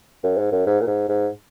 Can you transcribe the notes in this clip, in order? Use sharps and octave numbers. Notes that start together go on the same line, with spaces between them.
F#2
G#2
F#2
G#2
A#2
G#2
G#2